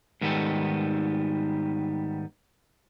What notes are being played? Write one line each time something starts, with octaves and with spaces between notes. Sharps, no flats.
G#2 D#3 G3 B3 A4